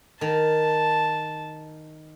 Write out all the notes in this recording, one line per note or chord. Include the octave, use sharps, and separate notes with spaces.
D#3 A#4 A5